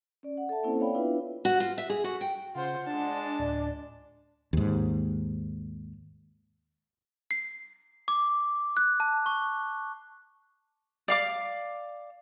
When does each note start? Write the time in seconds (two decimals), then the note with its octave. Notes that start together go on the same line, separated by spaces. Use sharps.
0.23 C#4 D5
0.37 F#5
0.49 A4 E5 A5
0.63 A#3 C4 C#4 E4 A4 C5
0.79 C#5 D5 F5 G5 B5
0.94 B3 D4 E4 F4 B4 E5
1.45 F#4
1.60 F4
1.78 E5
1.90 G#4
2.04 F#4
2.21 G5
2.55 C#3 F4 C5 F#5
2.86 G#3 D4 A5
3.40 D1 D5
4.53 D#2 G#2
7.31 C7
8.08 D6
8.77 F#6
9.00 A5
9.26 C#6
11.08 D5 F5 D6